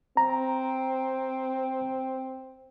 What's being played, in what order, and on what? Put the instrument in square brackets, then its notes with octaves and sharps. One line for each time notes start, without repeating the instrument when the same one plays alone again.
[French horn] C4 [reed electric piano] A#5